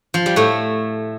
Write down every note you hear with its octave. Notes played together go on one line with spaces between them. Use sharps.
F3
G3
A2 A3